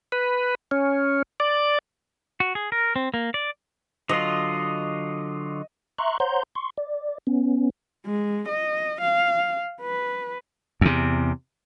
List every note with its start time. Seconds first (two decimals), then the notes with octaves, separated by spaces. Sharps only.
0.12 B4
0.71 C#4
1.40 D5
2.40 F#4
2.55 G#4
2.72 A#4
2.96 C4
3.14 A#3
3.34 D5
4.09 D3 F#3 F4 D#5
5.98 E5 A#5 C6 C#6 F#6
6.20 C5 C#5 F#5 A#5 C6 G6
6.55 C6 C#6
6.77 D5
7.27 B3 C#4
8.06 G#3
8.48 D#5
9.01 F5
9.81 B4
10.81 E2 C3